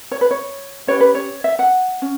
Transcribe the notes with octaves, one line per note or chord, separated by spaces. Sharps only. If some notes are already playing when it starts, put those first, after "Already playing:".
C#5
B4
C#5
C#4 G4 B4 C#5
B4
C#5
E5
F#5
C#4